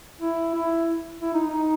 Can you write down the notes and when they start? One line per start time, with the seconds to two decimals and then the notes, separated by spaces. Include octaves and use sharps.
0.21 E4
0.55 E4
1.22 E4
1.34 D#4
1.44 D#4